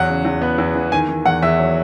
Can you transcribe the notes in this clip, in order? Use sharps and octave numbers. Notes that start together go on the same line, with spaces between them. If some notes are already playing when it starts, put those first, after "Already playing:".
Already playing: E2 F#3 F#5
C#3
E2
B3
E2
E3
D#3 G#5
D#3
E2 F#5
E2 E5
F#3